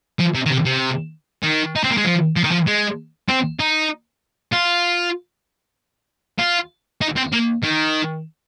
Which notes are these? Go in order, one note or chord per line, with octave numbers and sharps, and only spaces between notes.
F3
C3
D#3
C3
C3
D#3
D#4
C4
A#3
G#3
F3
F3
D#3
F3
G#3
C4
D#4
F4
F4
D#4
C4
A#3
D#3